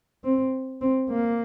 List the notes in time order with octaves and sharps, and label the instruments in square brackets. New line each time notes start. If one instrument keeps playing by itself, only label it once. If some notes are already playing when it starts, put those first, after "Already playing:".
[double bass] C4
C4
A#3